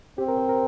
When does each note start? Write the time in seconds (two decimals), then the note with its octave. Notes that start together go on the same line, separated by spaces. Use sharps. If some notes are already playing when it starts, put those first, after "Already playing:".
0.18 C4 G4
0.28 A#4
0.38 C5
0.49 A#4